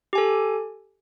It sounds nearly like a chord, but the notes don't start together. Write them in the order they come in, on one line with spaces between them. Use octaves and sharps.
G4 G#5 A4